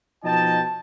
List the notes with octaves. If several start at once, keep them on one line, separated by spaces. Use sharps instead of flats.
B2 F3 D#4 D#5 G5 A5